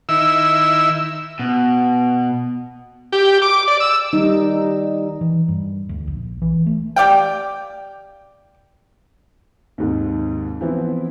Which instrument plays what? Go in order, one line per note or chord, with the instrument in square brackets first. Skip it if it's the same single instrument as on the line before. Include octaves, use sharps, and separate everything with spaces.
[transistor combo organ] D#3 E4 E6
[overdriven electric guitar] B2
[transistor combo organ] G4
D6
D5
E6
[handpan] D#3 G3 D#4
[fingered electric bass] E3
G2
D2
A#1
E3
A3
[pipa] G4 D5 F5 G5
[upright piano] D#2 G#2 C3
E3 F3 B3 C4 E4